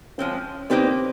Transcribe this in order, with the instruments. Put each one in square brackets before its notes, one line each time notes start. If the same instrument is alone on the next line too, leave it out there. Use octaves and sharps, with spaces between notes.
[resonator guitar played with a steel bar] F3 G#3 C4 [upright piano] C#4
[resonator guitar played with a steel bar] A#3 D#4 G4 B4 D5 [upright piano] C4